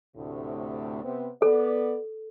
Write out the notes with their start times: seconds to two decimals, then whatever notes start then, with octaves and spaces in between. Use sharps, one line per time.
0.17 D2 A2 C3
1.03 C3 B3 C4
1.42 B3 A4 D5